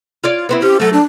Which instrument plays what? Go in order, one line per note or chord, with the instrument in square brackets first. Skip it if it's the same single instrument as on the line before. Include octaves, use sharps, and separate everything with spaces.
[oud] F4 C#5 D5
B3 C4 E4
[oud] C#4 [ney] G4
[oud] F#3 A3 [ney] A4
[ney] D4